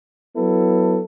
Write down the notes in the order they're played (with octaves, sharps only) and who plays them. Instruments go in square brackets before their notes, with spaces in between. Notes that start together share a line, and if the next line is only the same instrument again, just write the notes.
[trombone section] F#3 B3 E4 A4